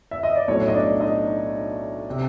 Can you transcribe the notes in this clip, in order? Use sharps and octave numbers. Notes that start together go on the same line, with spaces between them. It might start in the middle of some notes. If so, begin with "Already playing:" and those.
E5
D#5
D5
B1 A2 F#3 A3 C#5
D#5
D4 D5
D#4 D#5
C3